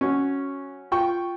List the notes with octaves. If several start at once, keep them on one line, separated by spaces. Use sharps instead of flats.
F#3 C#4
F4 G5 C#6